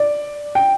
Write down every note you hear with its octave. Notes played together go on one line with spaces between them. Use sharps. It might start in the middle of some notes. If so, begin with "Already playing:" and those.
Already playing: D5
G5